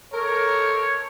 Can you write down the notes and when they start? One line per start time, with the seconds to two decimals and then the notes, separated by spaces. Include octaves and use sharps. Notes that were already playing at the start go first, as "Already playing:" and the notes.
0.12 A4 A#4 C#5